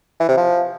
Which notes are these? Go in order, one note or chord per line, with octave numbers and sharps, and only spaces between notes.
E3
C3
F3